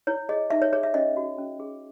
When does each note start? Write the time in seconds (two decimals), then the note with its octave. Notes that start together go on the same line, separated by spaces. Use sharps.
0.07 E4 C#5
0.29 G#4 D#5
0.50 D#4 E5
0.62 C#5
0.73 G#4 C#5
0.83 E5
0.94 C#4 D#5
1.17 F#4
1.38 C#4
1.60 G#4